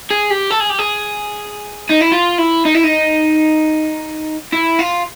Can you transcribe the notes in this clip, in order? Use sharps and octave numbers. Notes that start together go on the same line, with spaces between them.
G#4
G4
A4
G#4
G4
G#4
D#4
E4
F4
E4
D#4
E4
D#4
E4
F4